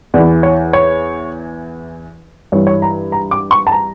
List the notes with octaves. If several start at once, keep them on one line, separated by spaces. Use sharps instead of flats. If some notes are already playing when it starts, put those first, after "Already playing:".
E2 E3 D5
C#5
C#5
G2 E3 C#5
C#5
A#5
A#5
D6
C#6
A5
A#5